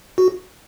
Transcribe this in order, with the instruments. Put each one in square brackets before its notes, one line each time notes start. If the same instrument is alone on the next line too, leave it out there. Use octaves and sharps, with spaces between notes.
[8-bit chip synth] F#4